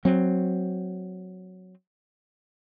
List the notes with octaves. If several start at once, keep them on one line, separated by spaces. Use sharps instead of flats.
F#3 C4